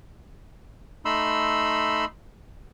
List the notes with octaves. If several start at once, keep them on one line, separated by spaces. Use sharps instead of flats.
A3 D#4 B5 C6 E6